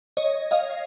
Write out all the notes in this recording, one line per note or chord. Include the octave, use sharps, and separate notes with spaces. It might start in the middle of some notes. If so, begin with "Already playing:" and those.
C#5 D#5
D#5 F5